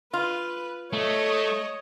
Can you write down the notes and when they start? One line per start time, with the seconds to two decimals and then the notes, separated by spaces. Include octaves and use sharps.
0.13 F4 B4
0.93 A3 C#5 D#5